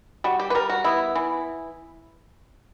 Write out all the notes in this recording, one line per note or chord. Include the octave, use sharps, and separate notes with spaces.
G3 F#4
G4
B4
G3 A#4
F#4
B3 E4
E3